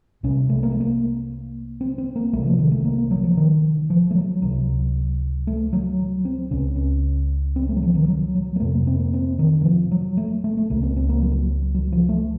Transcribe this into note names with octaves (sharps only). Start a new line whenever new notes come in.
C2 C3 C#4
A3
A#3
A3
A#3
C4
C4
A#3
C2 C3 A3
F3
D#3
A3
A#3
A#3
F#3
F3
D#3
F3
A3
F#3
C#2 C3 F#3
A3
F#3
F#3
C4
C#2 C#3 C#4
C#4
C4
A3
F#3
F3
D#3
F#3
F#3
A#3
F2 C3 A3
A#3
C4
A#3
C4
D#3
D#3
F3
F#3
A3
A3
A3
C#2 C#3 A#3
C4
C4
A#3
F#3
F#3
F3
A3